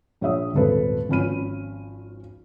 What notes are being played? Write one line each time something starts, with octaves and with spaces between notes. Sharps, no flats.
A#1 C#5 E5 D#6
D#1 G#1 A4 B4
G#1 F3 C#4 B5 F6 D#7